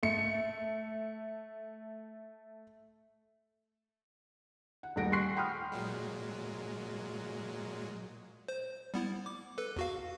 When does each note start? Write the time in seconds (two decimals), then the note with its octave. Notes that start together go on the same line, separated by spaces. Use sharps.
0.03 A3 C#7
4.83 F#5
4.96 D#1 G3 A3 F#5 A#6 D7
5.12 C6 C#6 F#6 C7
5.36 F#5 G5 B5 C6 D#6 F6
5.72 A#2 F#3 G#3
8.48 C5
8.94 G3 B3 E4
9.26 D6
9.58 A4 B4
9.76 E2 F#4 F5